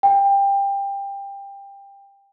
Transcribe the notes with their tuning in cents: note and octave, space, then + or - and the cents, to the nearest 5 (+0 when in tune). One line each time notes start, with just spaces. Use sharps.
G5 +20